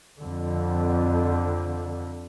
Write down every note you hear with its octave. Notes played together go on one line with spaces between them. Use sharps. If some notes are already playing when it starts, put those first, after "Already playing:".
F2 D3